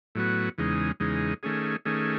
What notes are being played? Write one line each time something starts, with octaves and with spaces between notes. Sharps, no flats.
A2 F#3 B3 F#4
E2 C#3 G#3 D#4
E2 C#3 G#3 D#4
D#3 A3 C#4 G#4
D#3 A3 C#4 G#4